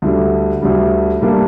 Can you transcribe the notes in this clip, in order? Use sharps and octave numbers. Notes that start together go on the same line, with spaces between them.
D2 D3 G3
D2 D3 G3
A2 G3 A#3 D4